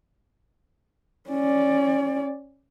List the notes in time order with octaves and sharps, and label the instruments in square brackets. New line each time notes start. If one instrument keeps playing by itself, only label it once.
[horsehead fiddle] C#4 D5